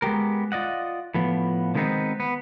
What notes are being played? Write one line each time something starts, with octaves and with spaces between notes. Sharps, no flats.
G#3 B3 G4 A#4
F4 D5 D#5 F#5
A2 F3 B3
D3 D#3 G#3 B3 C4 D#4
B3